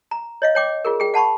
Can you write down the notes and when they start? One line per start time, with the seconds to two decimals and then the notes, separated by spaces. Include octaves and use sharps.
0.11 A#5
0.42 C#5 D#5 F5
0.55 C#5 G5 D6
0.85 F4 G#4 A#4
1.00 G#4 G5
1.14 F#5 A5 B5 C#6